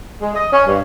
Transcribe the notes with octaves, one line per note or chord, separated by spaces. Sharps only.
G#3
D#5
C#4
G2